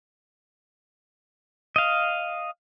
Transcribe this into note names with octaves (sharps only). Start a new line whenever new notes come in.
D#5 F5